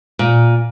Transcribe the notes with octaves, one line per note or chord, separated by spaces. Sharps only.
A#2